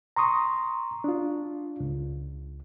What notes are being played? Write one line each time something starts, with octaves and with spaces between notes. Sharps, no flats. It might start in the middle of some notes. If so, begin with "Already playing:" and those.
A#5 C6 C#6 D#6
D4 F4
C#2